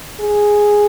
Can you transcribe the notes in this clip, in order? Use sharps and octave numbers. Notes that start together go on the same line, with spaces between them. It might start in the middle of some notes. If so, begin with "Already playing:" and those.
G#4